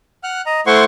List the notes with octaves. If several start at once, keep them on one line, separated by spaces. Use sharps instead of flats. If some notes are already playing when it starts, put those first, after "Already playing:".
F#5 F6 F#6
D#5 A#5
A3 E4 C5 F#5 C6 C#6